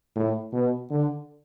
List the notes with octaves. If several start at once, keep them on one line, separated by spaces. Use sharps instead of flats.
A2
B2
D3